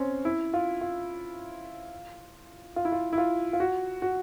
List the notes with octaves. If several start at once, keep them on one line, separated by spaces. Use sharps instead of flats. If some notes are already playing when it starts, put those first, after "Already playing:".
Already playing: C4 C#4
E4
F4
F4
F4
E4
F4
E4
F4
F4
F#4
F#4